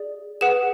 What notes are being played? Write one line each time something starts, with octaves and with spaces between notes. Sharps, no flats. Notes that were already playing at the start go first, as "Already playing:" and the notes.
Already playing: G#4 D5
G#4 B4 F#5 E7